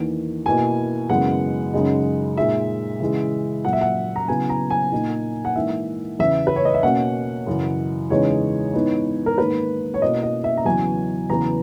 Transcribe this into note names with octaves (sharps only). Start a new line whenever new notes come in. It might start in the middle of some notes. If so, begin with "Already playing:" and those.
Already playing: E2 D#3 A#3
B2 A#3 E4 G#5
F#2 C#3 E3 G#3 B3 F#5
F#2 C#3 G#3 D#4
A#2 G#3 D#4 E5
C#3 E3 G#3
A#2 F#3 A#3 F#5
E5
F#5
A#5
C#3 F#3 B3 E4 G#5
A#5
G#5
A#2 A#3 D#4
F#5
G#2 E3 A#3 D#4 E5
E2 C#3 E3 E5
B4
C#5
D#5
E5
B2 A#3 C#4 F#5
F#2 C#3 E3
E2 C#3 G#3 D#4 C#5
G#2 E3 B3 D#4
A#4
G#2 D#3 A#3 B4
C#5
B2 A#3 E4 D#5
D#5
E5
A#5
E2 C#3 F#3 B3 G#5
E2 C#3 F#3 B3 A#5